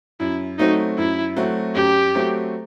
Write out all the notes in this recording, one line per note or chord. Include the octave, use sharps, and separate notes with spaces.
F#2 E4
F#3 A3 C4 D#4 F#4
F#2 E4
F#3 A3 C4 F#4
F#2 G4
F#3 A3 C4 F#4